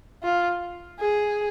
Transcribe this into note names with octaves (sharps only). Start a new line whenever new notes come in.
F4
G#4